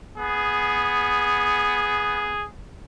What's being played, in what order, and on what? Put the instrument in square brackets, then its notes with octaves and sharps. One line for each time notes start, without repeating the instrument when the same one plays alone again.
[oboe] B3 [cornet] G#4